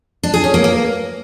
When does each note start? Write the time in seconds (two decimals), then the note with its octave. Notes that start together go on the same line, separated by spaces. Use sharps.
0.23 D4
0.34 G#4
0.44 C#4
0.54 A#3
0.64 A#3